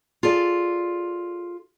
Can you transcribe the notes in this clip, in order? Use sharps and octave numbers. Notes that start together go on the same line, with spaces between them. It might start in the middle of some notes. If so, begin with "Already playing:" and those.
F4 G#4 A4 D5